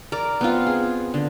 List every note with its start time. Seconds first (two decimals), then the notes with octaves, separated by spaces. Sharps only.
0.12 A#4 D5
0.41 B3 C4 F4
0.67 G#4
1.14 D3